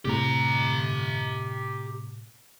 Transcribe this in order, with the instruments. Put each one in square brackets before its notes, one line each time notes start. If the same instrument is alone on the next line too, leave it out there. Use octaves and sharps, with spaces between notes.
[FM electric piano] A2 C3 [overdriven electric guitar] G4 A#5